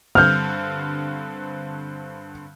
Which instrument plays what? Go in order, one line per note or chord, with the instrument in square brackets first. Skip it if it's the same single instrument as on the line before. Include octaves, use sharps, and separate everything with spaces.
[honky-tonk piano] G2 D3 C4 [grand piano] F6 G6